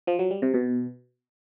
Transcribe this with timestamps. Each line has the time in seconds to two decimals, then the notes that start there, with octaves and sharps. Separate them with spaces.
0.07 F3
0.19 F#3
0.31 G3
0.42 C3
0.54 B2